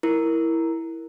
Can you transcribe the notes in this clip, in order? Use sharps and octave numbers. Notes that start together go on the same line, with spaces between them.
E4 A#4